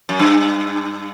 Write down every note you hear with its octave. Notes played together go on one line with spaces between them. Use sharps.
F#2
G2